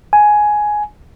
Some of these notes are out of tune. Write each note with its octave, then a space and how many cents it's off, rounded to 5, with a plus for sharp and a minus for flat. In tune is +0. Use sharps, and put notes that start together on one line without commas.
G#5 +10